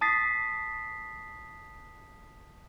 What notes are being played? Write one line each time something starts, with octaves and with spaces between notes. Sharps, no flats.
A5 D#6 A6 B6 C7